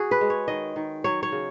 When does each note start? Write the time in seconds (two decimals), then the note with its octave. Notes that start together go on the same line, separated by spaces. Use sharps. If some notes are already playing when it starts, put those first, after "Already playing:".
Already playing: F#4 G#4
0.11 B4
0.21 G#3
0.30 C#5
0.48 D#3 D#5
0.76 D#3
1.04 F#3 C#5
1.23 C#5
1.32 C#3